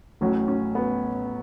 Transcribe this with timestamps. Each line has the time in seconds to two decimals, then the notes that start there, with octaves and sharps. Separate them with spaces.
0.21 A1 A2 F#3 C#4
0.48 C#4
0.75 B3